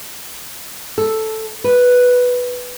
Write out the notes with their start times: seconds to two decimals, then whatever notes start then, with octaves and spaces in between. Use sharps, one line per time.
0.98 A4
1.64 B4